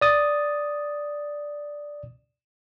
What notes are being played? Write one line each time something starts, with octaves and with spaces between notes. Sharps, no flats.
D5 D#6 A6